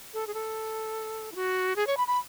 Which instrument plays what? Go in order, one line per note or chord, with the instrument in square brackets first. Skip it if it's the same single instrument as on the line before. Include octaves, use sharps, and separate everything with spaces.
[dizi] A4
G#4
A4
E4
F#4
G#4
C#5
B5
B5